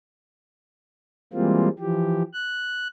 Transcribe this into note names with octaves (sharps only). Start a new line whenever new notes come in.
E3 G3 G#3 A#3 C4 F4
E3 F3 G4
F#6